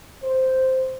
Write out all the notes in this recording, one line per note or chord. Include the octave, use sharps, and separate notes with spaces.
C5